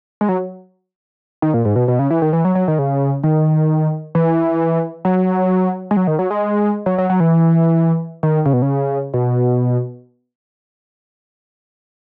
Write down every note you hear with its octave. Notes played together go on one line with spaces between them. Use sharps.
G#3
F#3
D#3
A#2
G#2
B2
B2
C#3
E3
D#3
E3
F#3
F#3
D#3
C#3
D#3
E3
F#3
G#3
F#3
D#3
F#3
G#3
F#3
F#3
F#3
E3
D#3
C#3
B2
C#3
B2